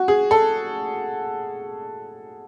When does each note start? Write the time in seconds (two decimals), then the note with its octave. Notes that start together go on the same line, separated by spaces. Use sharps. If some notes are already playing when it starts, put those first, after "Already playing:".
Already playing: F#4
0.08 G#4
0.31 A4